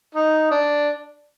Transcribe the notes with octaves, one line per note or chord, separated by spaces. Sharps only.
D#4
D4